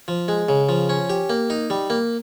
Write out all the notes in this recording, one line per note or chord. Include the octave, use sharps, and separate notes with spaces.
F3
G#3
C#3
F3
C#4
G4
A#3
D#4
G3
A#3